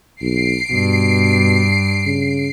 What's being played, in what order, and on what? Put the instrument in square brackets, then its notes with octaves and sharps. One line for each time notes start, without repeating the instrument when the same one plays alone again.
[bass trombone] B1 [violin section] C7 D7
[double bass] G2 [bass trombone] B2
[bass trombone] C#3